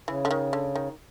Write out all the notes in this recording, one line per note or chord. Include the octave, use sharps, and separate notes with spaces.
C#3 E3
D3
D#3
D3
D#3